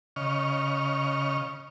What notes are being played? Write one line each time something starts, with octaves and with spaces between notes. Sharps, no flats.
C#3 D#5 C#6 F6